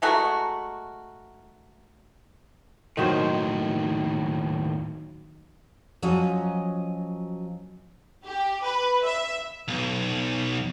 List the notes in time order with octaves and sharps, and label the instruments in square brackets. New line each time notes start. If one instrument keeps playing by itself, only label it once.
[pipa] G#3 A3 F#4 A#4
[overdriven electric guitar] D#2 A2 [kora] D#3 F#3 C5
[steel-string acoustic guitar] F3 F#3 C#4 D#5
[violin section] G4
B4
E5
[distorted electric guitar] B1